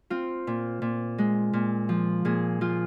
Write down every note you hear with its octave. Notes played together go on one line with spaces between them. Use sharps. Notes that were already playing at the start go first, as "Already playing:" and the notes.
C4 F4
A#2
A#2
G#3
A#2
F3
A#2 G#4
F3 F4